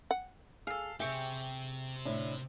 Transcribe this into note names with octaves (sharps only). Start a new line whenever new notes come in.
F#5
G#4 A4 F5
C3 G4 G#4 E5 G5 C#6
A2 D3 E4